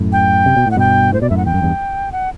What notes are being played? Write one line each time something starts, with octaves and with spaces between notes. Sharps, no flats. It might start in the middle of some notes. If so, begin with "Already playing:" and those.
Already playing: F#2 A2
G5
C3
B2
A2 F#5
G2 B2 G5
A2 C5
B2 D5
F#2 A2 E5
F#5
E2 G5
F#2
E2 G2
F#5